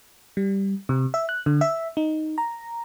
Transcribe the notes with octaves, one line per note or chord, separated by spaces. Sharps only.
G3
C3
E5
F#6
D3
E5
D#4
A#5